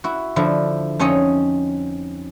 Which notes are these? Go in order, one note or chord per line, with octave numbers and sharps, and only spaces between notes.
E4 F#4
D3 F3 E4
F2 C#4 D#4 C#5 D#5